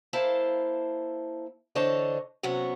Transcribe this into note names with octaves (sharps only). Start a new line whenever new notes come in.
A#3 E4 C5 F5 A5
D3 E3 C5 C#5 D#5 A5
C3 F#3 B3 C#4 F#5